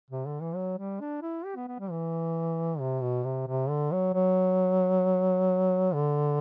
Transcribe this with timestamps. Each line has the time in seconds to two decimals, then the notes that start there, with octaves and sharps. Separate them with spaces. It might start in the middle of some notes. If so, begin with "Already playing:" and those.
0.10 C3
0.26 D3
0.41 E3
0.55 F#3
0.78 G3
1.01 D4
1.22 E4
1.45 G4
1.56 B3
1.68 B3
1.80 G3
1.91 E3
2.80 C3
3.02 B2
3.25 C3
3.48 C3
3.70 D3
3.93 F#3
4.14 F#3
5.94 D3